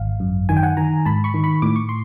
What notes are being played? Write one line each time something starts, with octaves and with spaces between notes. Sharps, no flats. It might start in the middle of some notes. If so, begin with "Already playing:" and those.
Already playing: G#1 F5
F#2
D#3 G#5
G5
F#5 G#5
D#3 G#5 A#5
G#2 A5 B5
B5 C#6
D#3
B5 C#6
A2 D6
C#6
C6